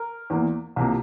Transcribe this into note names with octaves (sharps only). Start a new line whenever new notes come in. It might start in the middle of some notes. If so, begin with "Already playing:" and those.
Already playing: A#4
E2 E3 A#3
C2 C3 F3 A#3